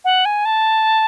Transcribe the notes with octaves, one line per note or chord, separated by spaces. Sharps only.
F#5
G#5
A5